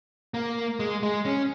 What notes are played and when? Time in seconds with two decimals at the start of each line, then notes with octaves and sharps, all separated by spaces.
0.34 A#3
0.80 G#3
1.03 G#3
1.26 C#4